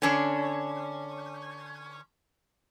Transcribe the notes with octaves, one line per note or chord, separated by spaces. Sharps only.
D3 C#4 D4